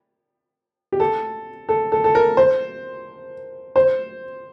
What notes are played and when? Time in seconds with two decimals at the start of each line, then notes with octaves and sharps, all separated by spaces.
0.92 G4
1.00 A4
1.69 A4
1.92 A4
2.04 A4
2.15 A#4
2.37 C5
3.76 C5